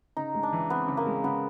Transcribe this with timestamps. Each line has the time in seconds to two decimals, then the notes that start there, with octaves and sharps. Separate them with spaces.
0.17 C#3 D#4
0.35 G#3
0.43 D4
0.53 E3
0.70 B3 C4
0.88 C#3
0.97 A#3
1.06 G#3
1.24 C#3 B3